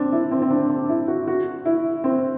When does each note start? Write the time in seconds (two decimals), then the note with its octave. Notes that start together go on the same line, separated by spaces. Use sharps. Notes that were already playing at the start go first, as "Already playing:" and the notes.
Already playing: C4 D4
0.12 E4
0.32 C4
0.42 C4
0.51 D4
0.70 D4
0.89 E4
1.08 F#4
1.27 F#4
1.66 E4
2.04 C4